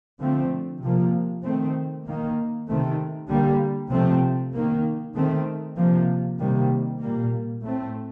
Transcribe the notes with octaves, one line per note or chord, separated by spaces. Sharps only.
D3 F3 A3 C4
C3 F3 A#3
D#3 A3 C4
D#3 A#3
C3 D#3 A3 C4
D3 G3 A#3
C3 F3 A3 C4
D#3 A#3
D#3 A3 C4
C3 F3 A#3
C3 D#3 G3 A#3
A#2 G3 A#3
A2 A3 C4